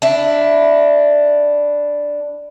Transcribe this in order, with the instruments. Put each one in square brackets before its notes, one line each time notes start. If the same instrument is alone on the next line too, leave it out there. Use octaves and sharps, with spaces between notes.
[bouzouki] D4 E4